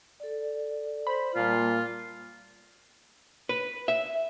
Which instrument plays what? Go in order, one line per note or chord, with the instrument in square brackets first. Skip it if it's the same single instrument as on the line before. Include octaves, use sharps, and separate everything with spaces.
[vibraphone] A4 D5
[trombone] C5 [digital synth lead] B5
[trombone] A#2 [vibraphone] G3 A#3 A5 [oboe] F4
[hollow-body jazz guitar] B4
E5